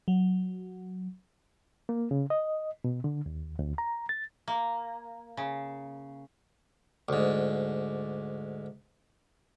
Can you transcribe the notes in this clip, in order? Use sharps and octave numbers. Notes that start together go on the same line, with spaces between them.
F#3
A#3
C#3
D#5
B2
D3
D#2
D2
A#5
A6
A#3
C#3
D2 G#2